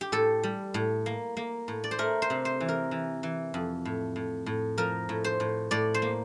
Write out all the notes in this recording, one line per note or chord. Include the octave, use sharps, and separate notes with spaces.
G4
A2 A4
G3
A2
A#3
A#3
A2
D5
C5
A3 A#4
C5
C3
C5
E3
A#4
E3
E3
F2
A2
A2
A2
F3 A#4
A2
C5
A2
A2 D5
C5
A#3